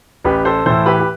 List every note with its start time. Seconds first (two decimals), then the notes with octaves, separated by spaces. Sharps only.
0.24 A1 G4 B4
0.45 A4 C5
0.66 A2 E3 A4 C5
0.86 G4 B4
0.99 G4